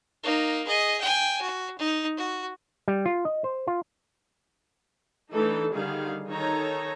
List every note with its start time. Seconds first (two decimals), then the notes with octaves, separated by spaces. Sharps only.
0.23 A#3 D#4
0.67 G#4 D#5
1.01 G5 G#5
1.41 F#4
1.79 D#4
2.17 F#4
2.88 G3
3.06 F4
3.25 D#5
3.44 C5
3.67 F4
5.31 E3 A3 D4 D#4 A4
5.72 D3 D#3 G3 G#4 F5
6.28 D#3 D#4 A4 C#5 A#5